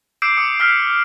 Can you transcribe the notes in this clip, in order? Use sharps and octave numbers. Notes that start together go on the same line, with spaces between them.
D6 E6 G6 C7 D7 E7
D6 D#6 C#7
E6 F6 B6